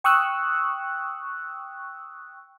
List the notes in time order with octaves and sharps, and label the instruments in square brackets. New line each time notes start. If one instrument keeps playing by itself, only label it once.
[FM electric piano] G5 C#6 D#6 E6 F#6